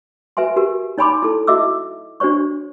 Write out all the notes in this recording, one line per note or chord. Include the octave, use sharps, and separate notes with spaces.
F#4 B4 E5 G#5 C6
F#4 G4 A#4
D#4 C#5 G#5 B5 C6 D6
E4 A4
E4 F#4 D#5 E5 D6 E6
D4 F#4 C5 C#5 C#6